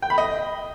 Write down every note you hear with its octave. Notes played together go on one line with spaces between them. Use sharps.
G5
B5
D#5